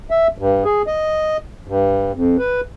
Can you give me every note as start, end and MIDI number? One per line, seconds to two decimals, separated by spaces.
0.10 0.28 76
0.38 0.64 43
0.65 0.82 68
0.87 1.37 75
1.67 2.12 43
2.14 2.37 41
2.38 2.61 71